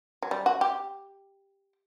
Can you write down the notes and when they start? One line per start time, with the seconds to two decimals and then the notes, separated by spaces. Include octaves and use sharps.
0.22 F#3
0.31 G3
0.46 F#4
0.61 G4